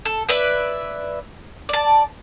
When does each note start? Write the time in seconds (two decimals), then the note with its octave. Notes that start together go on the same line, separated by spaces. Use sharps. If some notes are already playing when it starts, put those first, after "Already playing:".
0.05 A4
0.29 E4 B4 D5 E5
1.69 D5 A5